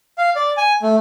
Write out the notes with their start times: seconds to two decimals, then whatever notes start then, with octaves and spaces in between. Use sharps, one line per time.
0.18 F5
0.36 D5
0.57 G#5
0.82 A3